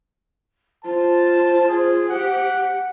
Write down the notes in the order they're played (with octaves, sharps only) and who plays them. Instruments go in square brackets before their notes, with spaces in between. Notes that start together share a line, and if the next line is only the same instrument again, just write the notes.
[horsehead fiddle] F4 [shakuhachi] C5 [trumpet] A5
[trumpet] G#4
[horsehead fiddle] G4 [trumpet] F#5